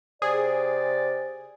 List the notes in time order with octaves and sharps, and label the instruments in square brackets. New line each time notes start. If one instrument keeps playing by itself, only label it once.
[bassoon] C3 [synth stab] G#4 [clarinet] D5